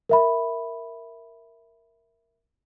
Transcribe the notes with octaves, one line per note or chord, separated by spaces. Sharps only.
A#4 E5 B5